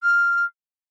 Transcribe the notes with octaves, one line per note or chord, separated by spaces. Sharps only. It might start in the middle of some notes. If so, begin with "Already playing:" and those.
F6